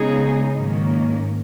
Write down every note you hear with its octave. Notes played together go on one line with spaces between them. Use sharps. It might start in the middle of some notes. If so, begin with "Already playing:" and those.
Already playing: C#3 G#3 B3 D#4 G#4
G#2 D#3 F#3 A#3 C#4